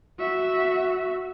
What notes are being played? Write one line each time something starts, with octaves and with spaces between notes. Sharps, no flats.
F#4 E5